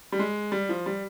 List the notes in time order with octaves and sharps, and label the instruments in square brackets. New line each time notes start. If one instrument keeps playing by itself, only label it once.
[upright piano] G3
G#3
G3
F3
G3